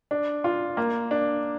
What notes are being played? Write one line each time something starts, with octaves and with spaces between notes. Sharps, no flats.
D4
F4
A#3
D4